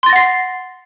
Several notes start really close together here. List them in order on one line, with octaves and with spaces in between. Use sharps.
C6 A6 A#6 F#5 C7